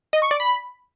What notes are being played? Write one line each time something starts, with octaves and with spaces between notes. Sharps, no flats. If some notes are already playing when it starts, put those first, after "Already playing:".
D#5
C#6
D5
B5